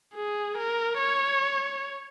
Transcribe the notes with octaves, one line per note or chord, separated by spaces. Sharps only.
G#4
A#4
C#5